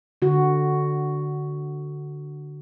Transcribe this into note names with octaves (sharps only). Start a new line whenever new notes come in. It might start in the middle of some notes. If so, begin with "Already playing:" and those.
D3 F#4